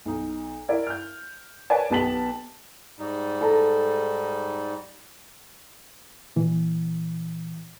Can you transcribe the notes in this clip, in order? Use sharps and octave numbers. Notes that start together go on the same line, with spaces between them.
B1 D#4
E4 A#4 D5
F6 G6
A#4 B4 C#5 D5 G#5 A5
B1 B3 G4 A5 B6 F#7
G#2 G3 D#4
A4 A5 A#5
A#2 E3